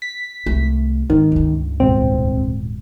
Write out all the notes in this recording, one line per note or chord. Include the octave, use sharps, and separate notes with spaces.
B6
C2 A3
G#1 D#3
C#2 G2
D#1 G#2 B2 C4